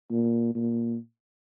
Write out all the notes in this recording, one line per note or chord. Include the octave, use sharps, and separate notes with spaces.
A#2
A#2